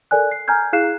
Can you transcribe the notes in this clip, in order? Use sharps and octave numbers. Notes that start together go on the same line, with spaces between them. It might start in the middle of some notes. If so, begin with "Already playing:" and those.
A4 A#4 D5 G#5 F#6
C7
G#5 A#5 F6 G6 G#6
E4 G#4 F5 F#6 C7 E7